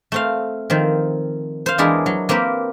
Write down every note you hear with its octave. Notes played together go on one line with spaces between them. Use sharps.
A3 C4 F5
D#3 F3 C4
C5 F5
E2 G#3 D4 E4 G#4 A#4
F#3
A#3 C4 G4 A#4 B4